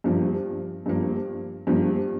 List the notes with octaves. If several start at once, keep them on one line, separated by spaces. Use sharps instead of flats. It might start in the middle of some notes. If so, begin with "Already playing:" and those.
G2 F3 A#3
G2 F3 A#3
G2 F3 A#3